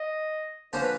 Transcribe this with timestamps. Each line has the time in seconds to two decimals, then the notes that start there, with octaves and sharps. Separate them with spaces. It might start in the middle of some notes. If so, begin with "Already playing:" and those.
Already playing: D#5
0.73 D3 F3 A#3 C#4 C5
0.82 B4